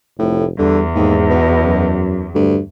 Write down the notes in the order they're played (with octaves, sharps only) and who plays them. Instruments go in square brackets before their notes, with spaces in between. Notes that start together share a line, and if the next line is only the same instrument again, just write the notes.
[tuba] F1 [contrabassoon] A2
[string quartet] E2 [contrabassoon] D3 [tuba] G3
[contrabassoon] D#2 [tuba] G#2
[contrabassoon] B2
[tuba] F#2
[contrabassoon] D2 [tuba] G2